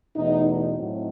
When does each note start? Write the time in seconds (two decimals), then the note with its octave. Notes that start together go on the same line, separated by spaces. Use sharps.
0.16 E2 B2 A3 D#4
0.45 D#4
0.74 A2 F#3 C4 D#4